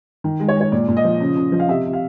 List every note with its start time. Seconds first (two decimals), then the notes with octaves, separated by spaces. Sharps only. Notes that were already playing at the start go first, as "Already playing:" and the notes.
0.24 D#3
0.40 G#3
0.48 C#5
0.55 G#3
0.61 C#5
0.72 A#2 D5
0.88 A#2
0.97 D#5
1.04 F3
1.20 C#3
1.37 C#3
1.52 F3
1.60 F5
1.68 C3 E5
1.85 C3
1.93 F5